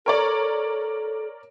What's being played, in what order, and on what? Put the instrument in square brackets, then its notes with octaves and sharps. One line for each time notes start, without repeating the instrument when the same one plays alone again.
[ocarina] A4 [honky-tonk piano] A#4 C#5 D5